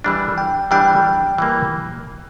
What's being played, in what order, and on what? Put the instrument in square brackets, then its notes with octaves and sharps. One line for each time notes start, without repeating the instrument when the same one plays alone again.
[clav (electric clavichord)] E3 G3 D4
[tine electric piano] G5
[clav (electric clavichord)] E3 G3 D4 [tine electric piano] G5
[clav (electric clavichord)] E3 G3 A#3